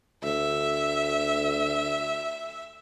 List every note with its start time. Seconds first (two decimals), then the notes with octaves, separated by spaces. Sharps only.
0.23 D2 E5